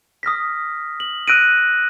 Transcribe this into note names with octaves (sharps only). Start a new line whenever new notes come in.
D#6 F6 A#6 B6
F#7
E6 F#6 A#6 D7 D#7